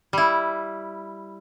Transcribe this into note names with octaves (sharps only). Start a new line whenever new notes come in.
G3 E4